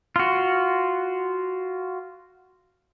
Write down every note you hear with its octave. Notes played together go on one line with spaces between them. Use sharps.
F4 F#4